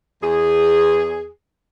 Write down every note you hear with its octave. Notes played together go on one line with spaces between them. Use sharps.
E2 G#4